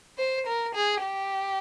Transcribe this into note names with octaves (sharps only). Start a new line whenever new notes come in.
C5
A#4
G#4
G4